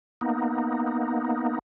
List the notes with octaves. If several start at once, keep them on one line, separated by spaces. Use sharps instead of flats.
A#3 B3 D#4